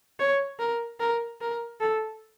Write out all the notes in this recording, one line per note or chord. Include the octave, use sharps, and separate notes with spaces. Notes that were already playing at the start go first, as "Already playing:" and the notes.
C#5
A#4
A#4
A#4
A4